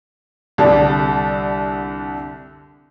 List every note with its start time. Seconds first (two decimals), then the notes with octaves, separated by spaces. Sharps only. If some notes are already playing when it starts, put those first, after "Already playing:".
0.58 C2 D3 G3 A4 D5 A5